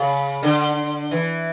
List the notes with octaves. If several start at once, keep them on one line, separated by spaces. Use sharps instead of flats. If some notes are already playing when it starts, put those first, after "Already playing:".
Already playing: C#3
D3
E3